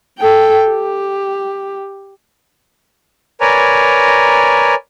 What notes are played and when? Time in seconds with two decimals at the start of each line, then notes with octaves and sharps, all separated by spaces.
0.19 A4 G5
0.69 G4
3.41 A#4 B4 C#5 D5 G#5 A#5